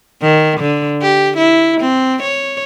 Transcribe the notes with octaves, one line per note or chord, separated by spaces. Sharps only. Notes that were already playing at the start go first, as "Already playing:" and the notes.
D#3
D3
G4
E4
C4
C#5